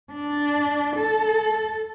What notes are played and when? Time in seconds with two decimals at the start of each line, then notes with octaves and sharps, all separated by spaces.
0.12 D4
0.96 A4